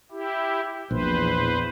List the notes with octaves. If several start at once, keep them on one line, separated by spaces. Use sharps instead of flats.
E4 G4
A#1 E2 B4 C5